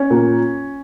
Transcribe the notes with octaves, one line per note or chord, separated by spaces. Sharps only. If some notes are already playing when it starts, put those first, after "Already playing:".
Already playing: C#4
A#2